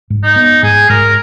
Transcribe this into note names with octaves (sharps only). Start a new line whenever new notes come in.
G#2
D#4
B3
G#2 G#4
G#2 A#4